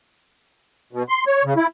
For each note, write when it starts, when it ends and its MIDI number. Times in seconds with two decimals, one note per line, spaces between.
0.93 1.03 47
1.09 1.24 84
1.27 1.44 73
1.44 1.54 49
1.57 1.67 64